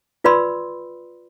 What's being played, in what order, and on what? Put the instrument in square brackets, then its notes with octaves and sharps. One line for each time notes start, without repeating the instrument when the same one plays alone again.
[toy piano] F4 B4 D5 B5 C6 E6